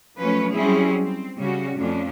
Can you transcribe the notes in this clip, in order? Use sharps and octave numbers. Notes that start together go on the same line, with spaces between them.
F3 F#3 A3 C#4 B4 C#5
F#3 G3 C4 C#4 E4 G#4
C4
C#3 G3 C#4 F#4
F2 A3 C#4 D4